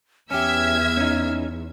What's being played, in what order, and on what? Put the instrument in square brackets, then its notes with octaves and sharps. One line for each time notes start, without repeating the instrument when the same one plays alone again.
[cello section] E2 [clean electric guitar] C#4 G4 [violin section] E5 E6 G#6 [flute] F6
[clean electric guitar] C#4 D#4